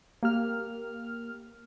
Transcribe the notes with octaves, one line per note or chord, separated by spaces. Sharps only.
A#3 G4 F6